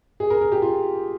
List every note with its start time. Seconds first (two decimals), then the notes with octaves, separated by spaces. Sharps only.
0.20 G#4
0.30 A#4
0.41 A#4
0.52 G4
0.62 F4